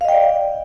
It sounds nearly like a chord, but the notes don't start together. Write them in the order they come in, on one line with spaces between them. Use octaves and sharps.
F5 D#5 G5 D5